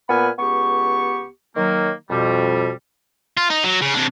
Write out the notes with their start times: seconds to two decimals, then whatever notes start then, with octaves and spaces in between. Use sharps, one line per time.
0.09 A#2 B3 B4 G#5 B5 F6
0.39 C#2 B3 G4 C#6
1.56 D#3 F#3 A#3
2.10 F2 B2 G3
3.37 F4
3.50 D#4
3.64 F#3
3.82 C#3
3.94 C3 D4